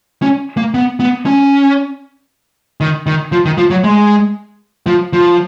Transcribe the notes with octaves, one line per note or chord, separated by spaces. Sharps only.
C#4
A#3
B3
B3
C#4
D#3
D#3
F3
D#3
F3
F#3
G#3
F3
F3